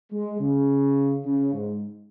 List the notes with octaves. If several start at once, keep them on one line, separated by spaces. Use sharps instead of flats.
G#3
C#3
C#3
G#2